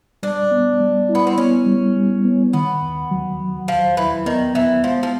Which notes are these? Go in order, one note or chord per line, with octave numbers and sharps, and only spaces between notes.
G3 D4
B3
G3
E4
B3
C4
B3 C#4
G3
G3
B3
D#3 B3
D#2
F#3
F#3
D#2 F3
D#2 E3
D#3 B3
E3 B3
F3 G#3
F3